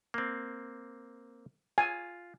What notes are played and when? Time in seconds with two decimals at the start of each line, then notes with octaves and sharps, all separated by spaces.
0.14 A#3 C4
1.78 F4 G#5